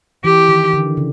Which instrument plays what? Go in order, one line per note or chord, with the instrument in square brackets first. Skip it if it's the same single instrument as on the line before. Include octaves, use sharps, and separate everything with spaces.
[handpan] E3 [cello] G4
[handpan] D#3
D3
C#3